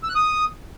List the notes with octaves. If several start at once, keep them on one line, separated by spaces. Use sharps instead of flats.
E6
F#6
D#6